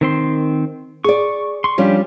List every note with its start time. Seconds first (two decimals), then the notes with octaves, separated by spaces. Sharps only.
0.01 D#3 C4 C6
1.04 G#4 D5 C#6
1.64 C6 C#6
1.78 F3 G3 C#4 D4 F4 G4